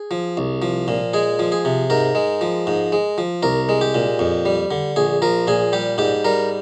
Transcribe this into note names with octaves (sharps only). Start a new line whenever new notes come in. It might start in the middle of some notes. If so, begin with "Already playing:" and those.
Already playing: G#4
F3
C2
F3
A#2
G#3 G#4
F3
G#4
C3
G#2 A#4
G#3
F3
G#2
G#3
F3
C2 A#4
G#3
G4
A#2
F2
G3
D3
A#1 G#4
F3 A#4
A#2 G#4
G3 G4
G#2 G4
G3 A#4